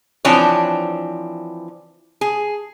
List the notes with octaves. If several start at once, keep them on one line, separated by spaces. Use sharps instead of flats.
E3 F3 C4 D4 C#5
G#4